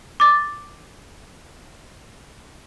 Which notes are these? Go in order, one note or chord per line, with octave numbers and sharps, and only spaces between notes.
D6 A6